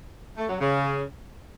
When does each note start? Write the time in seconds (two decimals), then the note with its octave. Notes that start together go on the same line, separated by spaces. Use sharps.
0.37 A3
0.49 F#3
0.60 C#3